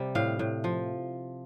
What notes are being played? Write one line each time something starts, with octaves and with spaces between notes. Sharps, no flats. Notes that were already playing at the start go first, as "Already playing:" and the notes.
Already playing: C3 G3
A2 F5
A2
F3